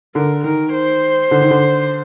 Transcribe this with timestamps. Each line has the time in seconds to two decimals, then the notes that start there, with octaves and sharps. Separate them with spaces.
0.15 D3 A#4
0.44 D#3 A#4
0.74 C5
1.31 D3
1.41 D#3
1.51 D3